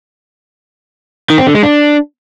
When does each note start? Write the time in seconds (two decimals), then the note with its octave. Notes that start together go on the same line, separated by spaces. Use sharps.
1.30 D#3
1.38 C4
1.46 D3
1.55 G#3
1.63 D4